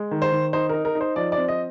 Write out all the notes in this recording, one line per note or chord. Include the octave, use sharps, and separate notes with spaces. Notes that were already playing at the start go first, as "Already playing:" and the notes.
Already playing: G#3
D#3
C5
D#3
D#4 C5
D#4 A#4
A#4
D#4
C5
F3 D5
D5
C4
D#5